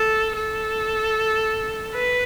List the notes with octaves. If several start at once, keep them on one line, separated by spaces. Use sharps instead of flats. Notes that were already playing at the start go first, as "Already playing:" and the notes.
Already playing: A4
A4
B4